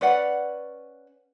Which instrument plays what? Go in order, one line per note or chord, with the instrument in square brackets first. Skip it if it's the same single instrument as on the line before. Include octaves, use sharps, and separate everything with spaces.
[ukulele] C#4 B4 D5 F#5